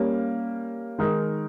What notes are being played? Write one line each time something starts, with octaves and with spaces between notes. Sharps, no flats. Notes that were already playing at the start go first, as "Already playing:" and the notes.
Already playing: G3 A#3 C#4
D#3 G#3 D#4 A#4